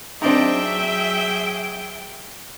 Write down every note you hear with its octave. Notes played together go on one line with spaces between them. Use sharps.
F#3 C4 D4 D#4 G#4 E5 G5